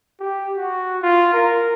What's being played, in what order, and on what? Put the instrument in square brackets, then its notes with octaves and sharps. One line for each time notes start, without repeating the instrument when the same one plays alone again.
[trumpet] G4
F#4
F4
A#4